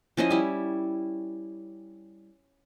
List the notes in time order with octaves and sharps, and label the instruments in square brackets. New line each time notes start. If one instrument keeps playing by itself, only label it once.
[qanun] F3 C#4 E4 D#5
G3 E4